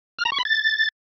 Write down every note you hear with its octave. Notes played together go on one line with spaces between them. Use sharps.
F6
A#5
C#6
B5
A6